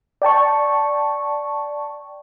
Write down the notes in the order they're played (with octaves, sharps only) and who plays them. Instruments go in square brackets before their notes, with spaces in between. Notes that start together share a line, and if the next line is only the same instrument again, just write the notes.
[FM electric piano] D5 G5 A5 C#6